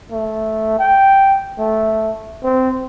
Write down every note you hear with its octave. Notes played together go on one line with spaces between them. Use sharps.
A3
G5
A3
C4